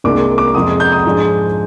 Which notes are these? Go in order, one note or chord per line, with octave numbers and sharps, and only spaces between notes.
C2 A#2 G#3 D4 D6
D6
F2 C3 F3 G#3 D#6
G6
D#6
G#2 F3 G#3 D4